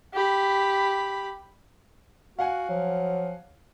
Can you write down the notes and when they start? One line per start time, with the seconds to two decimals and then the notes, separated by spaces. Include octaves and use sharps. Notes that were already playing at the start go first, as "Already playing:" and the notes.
0.13 G4 B5
2.39 F#4 F5 F#5 G#5
2.69 F3 F#3